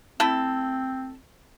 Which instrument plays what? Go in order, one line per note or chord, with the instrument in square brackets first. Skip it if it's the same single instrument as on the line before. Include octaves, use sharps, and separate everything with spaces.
[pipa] A3 E4 A4 [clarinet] C4